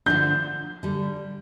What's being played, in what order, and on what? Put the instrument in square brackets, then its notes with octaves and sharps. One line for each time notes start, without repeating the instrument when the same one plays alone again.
[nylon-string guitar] D3 F3 A3 D4 [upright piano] G6
[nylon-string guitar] D3 G3